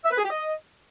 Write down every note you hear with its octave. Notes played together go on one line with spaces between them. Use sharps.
E5
B4
G#4
G4
D#5